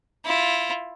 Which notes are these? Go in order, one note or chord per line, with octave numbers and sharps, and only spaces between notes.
E4 F4